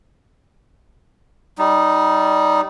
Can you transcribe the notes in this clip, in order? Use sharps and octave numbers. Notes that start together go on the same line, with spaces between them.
G3 D#4